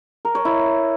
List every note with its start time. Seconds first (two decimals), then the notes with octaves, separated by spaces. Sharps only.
0.25 A#4
0.35 C#5
0.45 E4